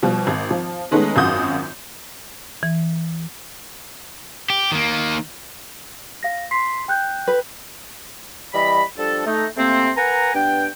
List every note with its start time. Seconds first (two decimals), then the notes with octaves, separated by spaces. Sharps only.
0.02 B2 F3 G3
0.27 G#1
0.50 F3
0.91 D#3 G#3 A3 B3 C#4 D#4
1.16 G#1 F#2 F4 F#4 D#6 G6
2.63 E3
4.50 G4
4.72 D#3 A#3
6.23 F5 A#6
6.51 C6 B6 C7
6.88 G5 F#6 G6
7.28 B4
8.53 E3 G3 D#5 B5
8.98 F3 G3 D4 A4
9.26 A3 D#4
9.57 C3 A3 A#3 C4
9.96 A#4 B4 F#5 G#5 A#5
10.34 G2 B3 D4 G5